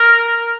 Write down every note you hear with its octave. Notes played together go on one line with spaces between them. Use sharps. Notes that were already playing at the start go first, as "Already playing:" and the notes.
Already playing: A#4